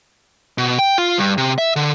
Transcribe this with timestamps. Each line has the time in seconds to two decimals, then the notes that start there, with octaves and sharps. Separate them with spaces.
0.58 B2
0.79 G5
0.98 F4
1.18 G2
1.38 C3
1.58 E5
1.76 D3